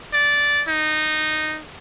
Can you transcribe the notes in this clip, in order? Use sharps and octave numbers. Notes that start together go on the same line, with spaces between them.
D5
D#4